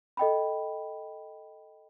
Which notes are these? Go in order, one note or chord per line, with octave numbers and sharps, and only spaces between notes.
A4 D#5 G5 B5